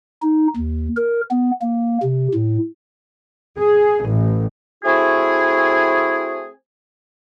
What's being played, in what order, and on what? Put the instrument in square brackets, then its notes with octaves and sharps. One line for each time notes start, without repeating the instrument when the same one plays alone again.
[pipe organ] D#4
D#2
A#4
B3
A#3
C3
A2
[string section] G#4
A1
[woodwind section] A3 C4 E4 F#4 G#4